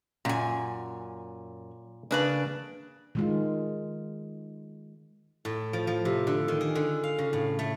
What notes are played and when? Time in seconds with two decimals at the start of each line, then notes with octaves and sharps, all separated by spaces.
0.25 F#2 A#2 G#5
2.11 C#3 A#3 D4 B4 D5 G#5
3.15 D#3 G#3 F4
5.45 A2
5.73 F3
5.87 F3
6.05 C3
6.27 D3
6.48 D#3
6.61 G#4
6.75 D3
7.04 F5
7.19 C#3
7.33 A2
7.59 A3